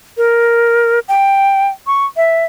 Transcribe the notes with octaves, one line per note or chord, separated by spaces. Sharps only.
A#4
G5
C#6
E5